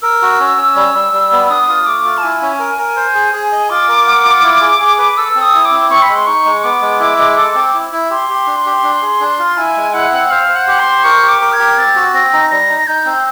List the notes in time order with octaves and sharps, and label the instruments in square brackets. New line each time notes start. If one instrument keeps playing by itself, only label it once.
[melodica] A#4 [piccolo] E6
[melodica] F#4
C#4
C#4
G3
G3
G3
B3
[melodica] D4 [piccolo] D#6
[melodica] F4
[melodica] A3 [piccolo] D6
[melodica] F4
[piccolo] A5
[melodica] E4 [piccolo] G#5
[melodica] C#4
A#4
A#4
C5
G#4
G#4
D#5
[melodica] F4 [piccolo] D6
[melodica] A#4
F#5
F4
E4
G#4
G#4
B4
[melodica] A4 [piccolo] E6
[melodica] C4
[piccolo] D#6
[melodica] E4
[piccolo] D6
[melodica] C4
[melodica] C4 [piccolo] C#6
[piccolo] B5
[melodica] G#3
[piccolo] C6
[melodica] D#4 [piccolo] C#6
[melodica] G#3
[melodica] B3 [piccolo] D6
[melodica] G#3
E4
G#3
A4
C4
E4
E4
[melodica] G4 [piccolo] C6
[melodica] G4
D4
G4
D4
G#4
D4
F4
[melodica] E4 [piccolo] G#5
[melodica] G#3
[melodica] E4 [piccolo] F#5
[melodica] C4
[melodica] C5 [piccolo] F5
[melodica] C5
[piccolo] F#5
[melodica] G4
[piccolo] C6
[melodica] C5
[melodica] A#4 [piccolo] C#6
[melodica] G4
[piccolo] D6
[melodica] A#4
[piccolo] G#6
[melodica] G4
[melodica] C4 [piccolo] A6
[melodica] F#4
[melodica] C4 [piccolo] A#6
[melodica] D#4
[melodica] G3 [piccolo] A#6
[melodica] D#4
[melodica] D#4 [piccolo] G6
[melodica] C4